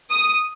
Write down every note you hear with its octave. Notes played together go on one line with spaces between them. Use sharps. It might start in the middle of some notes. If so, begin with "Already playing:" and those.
D#6